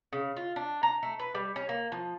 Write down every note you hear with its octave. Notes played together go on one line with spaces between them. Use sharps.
C#3
F4
D4
A#5
A3
B4
G3
C#4
A#3
F3